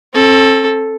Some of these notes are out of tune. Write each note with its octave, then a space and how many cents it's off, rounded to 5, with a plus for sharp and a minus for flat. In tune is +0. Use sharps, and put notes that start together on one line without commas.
C4 +40 A4 +0